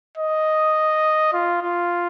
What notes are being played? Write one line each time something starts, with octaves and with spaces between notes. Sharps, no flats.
D#5
F4
F4